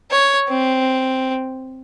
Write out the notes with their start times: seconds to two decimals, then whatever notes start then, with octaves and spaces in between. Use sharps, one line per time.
0.11 C#5
0.49 C4